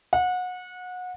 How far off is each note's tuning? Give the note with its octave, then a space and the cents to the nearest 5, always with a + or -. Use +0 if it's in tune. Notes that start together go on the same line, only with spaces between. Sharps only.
F#5 -25